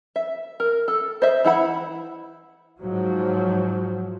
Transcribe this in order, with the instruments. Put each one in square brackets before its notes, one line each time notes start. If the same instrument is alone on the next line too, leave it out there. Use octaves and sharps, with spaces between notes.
[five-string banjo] E5
A#4
A4
C5 D#5 E5
E3 E4 F#5 B5
[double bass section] G#2 F3 F#3